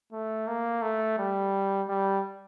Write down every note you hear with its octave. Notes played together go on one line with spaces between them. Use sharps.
A3
A#3
A3
G3
G3